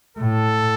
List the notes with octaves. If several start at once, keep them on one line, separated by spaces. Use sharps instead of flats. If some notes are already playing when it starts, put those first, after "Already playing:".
A2 A4